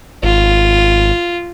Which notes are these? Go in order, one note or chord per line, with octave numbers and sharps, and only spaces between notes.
G#1 F4